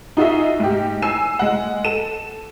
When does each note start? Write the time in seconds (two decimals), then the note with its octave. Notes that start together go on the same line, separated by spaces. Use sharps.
0.17 D#4 F4 F#4 G#4 E5
0.60 G#2 G4
1.02 G#5 E6 C7 E7
1.39 G#3 F#5
1.85 A4 E7